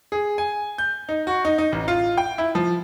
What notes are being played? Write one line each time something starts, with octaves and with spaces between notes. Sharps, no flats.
G#4
G#5
G6
D#4
F#4
D#4
D#4
A1
F4
G5
E4
F3